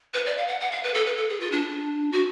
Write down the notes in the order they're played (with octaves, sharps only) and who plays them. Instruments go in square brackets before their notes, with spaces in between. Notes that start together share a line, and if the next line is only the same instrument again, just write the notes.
[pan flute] B4
D5
F5
F#5
F#5
F5
B4
A4
B4
A4
G#4
F4
D4
F#4